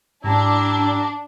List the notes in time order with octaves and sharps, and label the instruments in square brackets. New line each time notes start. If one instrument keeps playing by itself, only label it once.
[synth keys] G#2 [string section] D4 [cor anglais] E4 [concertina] G4 A#5